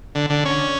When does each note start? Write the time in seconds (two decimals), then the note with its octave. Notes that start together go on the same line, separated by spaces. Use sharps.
0.15 D3
0.30 D3
0.45 C#4